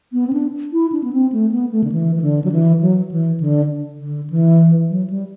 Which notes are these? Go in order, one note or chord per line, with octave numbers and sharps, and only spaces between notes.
B3
C4
D4
E4
D4
B3
C4
A3
B3
A3
D3
E3
E3
D3
F#3
E3
F#3
E3
D3
D3
E3
F#3
G3